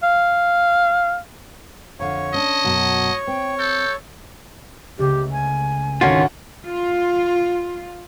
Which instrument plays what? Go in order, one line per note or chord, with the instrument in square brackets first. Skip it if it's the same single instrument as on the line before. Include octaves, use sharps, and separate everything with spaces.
[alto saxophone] F5
[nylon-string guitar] F2 D3 [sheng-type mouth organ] C#5 [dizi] F5
[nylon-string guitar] C#4 D4 [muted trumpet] D#5 [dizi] A5
[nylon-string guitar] F#2 B2 F#3
[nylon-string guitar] C4 [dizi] G5
[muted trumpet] A4 [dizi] G6
[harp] C#2 C#3 A3 [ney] G4
[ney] G#5
[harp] G#1 D2 G6 [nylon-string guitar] D3 F#4 [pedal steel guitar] D#3 C#4 F4
[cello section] F4